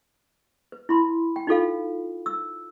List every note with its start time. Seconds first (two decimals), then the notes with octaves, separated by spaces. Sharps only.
0.72 B4
0.89 E4 B5 C6
1.36 G5
1.47 D#4 F4 A4 F5
2.26 E6